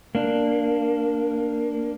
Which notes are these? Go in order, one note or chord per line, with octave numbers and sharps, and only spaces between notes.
A#3 D4